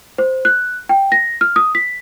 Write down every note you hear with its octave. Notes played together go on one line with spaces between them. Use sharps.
C5
F#6
G5
A#6
F6
D#6
B6